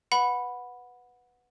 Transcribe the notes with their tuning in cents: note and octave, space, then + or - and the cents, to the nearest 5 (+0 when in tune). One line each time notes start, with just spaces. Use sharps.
B4 +0 F#5 -15 B5 +0